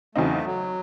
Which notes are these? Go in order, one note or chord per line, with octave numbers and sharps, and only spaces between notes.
E2 C#3 F#3 A3 C4 D#4
F#3